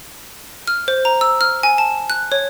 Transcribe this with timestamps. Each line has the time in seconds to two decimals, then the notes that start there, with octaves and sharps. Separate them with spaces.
0.68 F6
0.88 C5
1.05 A#5
1.21 E6
1.41 F6
1.63 G#5
1.78 A5
2.10 F#6
2.32 C#5